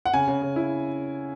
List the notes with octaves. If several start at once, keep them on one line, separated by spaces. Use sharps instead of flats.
F#5
C#3 G#5
C#3
C#3
E4